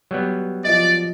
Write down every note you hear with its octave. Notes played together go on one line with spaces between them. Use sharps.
F#3 G3 B3
F3 D5 D#5